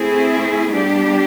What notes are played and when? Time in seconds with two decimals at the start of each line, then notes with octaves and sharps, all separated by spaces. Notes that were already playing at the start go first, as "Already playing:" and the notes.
Already playing: A3 C4 E4 G#4
0.73 G3 B3 D4 G4